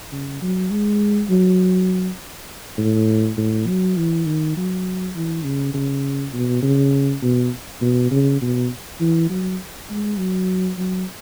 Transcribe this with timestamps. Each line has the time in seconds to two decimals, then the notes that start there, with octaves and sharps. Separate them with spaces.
0.12 C#3
0.42 F#3
0.71 G#3
1.30 F#3
2.78 A2
3.37 A2
3.67 F#3
3.97 E3
4.26 D#3
4.57 F#3
5.15 E3
5.44 C#3
5.74 C#3
6.33 B2
6.63 C#3
7.23 B2
7.81 B2
8.11 C#3
8.42 B2
9.00 E3
9.30 F#3
9.90 G#3
10.18 F#3
10.78 F#3